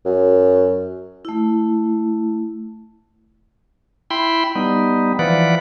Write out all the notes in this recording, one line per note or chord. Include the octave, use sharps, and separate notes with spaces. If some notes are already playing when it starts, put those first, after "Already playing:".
F#2
A3 E4
E4 G5 B5 C6
G3 B3 D#4
E3 F3 B4 D5 F#5